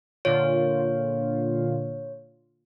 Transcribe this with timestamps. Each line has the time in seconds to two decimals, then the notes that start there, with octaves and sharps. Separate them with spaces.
0.25 A#2 D3 F4 C#5